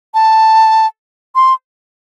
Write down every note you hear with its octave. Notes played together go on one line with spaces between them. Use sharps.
A5
C6